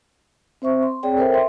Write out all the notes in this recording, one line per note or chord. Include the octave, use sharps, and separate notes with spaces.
C4 C5 E5 C#6
C6
C4 G#4 C#5 D5 G5
A4 A#4 C5 C#5 E5 G5
E5 C6